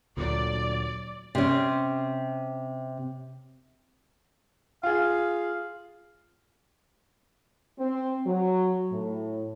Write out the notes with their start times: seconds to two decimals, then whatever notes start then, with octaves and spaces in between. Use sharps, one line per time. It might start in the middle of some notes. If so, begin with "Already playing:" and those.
0.17 D2 A#2 D3 F#3 D5
1.35 C3 C#4
4.83 F4 G#4 F5
7.78 C4
8.26 F#3
8.91 A2